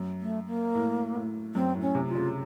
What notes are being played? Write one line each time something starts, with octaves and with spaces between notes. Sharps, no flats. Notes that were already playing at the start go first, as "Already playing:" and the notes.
Already playing: F#2
A3
A#3
A2
A2
F#2 C4
A2
C#4
C3
F4
C#3